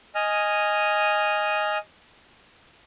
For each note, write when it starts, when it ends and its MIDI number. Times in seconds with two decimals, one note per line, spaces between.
0.15 1.78 75
0.15 1.78 80
0.15 1.78 89